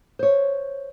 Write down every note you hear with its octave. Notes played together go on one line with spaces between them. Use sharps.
C5 C#5